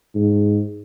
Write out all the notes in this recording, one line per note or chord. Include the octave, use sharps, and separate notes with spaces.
G#2